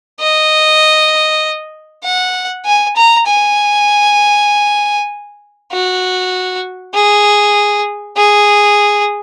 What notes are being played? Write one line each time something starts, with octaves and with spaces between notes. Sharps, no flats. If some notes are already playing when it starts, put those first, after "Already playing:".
D#5
F#5
G#5
A#5
G#5
F#4
G#4
G#4